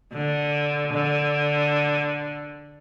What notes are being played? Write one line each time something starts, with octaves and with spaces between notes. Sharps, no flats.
D3
D3